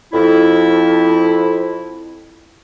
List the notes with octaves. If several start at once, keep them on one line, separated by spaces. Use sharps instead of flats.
F2 E4